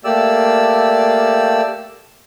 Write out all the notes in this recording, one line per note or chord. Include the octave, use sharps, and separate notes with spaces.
A3 A#3 G4 D5 E6